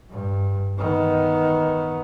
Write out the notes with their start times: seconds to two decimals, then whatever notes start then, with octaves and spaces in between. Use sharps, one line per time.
0.10 G2
0.78 D#3 B3